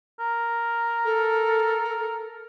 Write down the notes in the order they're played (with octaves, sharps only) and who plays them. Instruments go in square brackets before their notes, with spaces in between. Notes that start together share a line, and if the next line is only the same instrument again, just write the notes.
[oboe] A#4
[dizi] A4